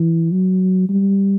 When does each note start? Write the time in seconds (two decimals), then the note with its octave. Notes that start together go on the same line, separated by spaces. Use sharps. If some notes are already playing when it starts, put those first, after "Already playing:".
Already playing: E3
0.31 F#3
0.89 G3